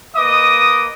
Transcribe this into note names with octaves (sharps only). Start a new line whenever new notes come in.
A#3 B4 D#5 D6 D#6